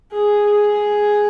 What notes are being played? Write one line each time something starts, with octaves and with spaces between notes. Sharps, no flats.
G#4
G#4